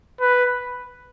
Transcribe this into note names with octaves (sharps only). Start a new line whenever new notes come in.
B4